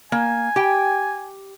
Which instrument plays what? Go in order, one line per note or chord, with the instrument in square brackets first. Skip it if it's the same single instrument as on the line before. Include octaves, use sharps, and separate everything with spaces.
[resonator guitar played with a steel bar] A#3 [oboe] G#5
[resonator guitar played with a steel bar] G4 G5